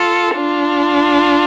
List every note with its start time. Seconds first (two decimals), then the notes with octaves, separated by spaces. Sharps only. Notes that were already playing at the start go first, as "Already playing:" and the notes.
Already playing: F4 A4
0.36 D4 F4